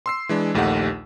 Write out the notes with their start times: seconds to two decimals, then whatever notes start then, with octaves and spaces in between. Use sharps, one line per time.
0.06 C6 E6 C7
0.29 E3 G#3 D4
0.54 A#1 D#2 A3 D#4 G4 F#5